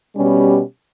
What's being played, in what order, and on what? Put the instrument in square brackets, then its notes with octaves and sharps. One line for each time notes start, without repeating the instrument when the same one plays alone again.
[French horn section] B2 G3 C#4 G4